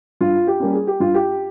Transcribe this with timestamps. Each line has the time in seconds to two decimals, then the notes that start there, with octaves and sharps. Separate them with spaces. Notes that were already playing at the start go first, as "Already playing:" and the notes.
0.21 G2 F4
0.47 G4
0.60 G3 A#3 C#4
0.73 G#4
0.87 G4
1.00 G2 F4
1.14 G4